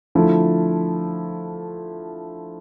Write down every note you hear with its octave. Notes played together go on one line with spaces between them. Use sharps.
D3 F3 A3 E4